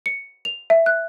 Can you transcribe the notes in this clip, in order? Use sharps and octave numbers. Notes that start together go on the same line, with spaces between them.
C#7
F7
E5
F#6